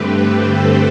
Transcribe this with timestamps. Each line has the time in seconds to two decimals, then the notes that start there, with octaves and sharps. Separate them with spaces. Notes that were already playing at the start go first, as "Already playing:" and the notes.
Already playing: G2 D3 A3 C4 G4 B4
0.42 A4 C5